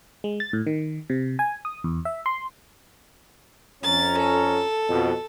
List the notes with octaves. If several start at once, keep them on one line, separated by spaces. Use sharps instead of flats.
G#3
A6
A2
D#3
C3
G#5
D#6
E2
E5
C6
F2 C#4 A#5 A6
A4
F2 B2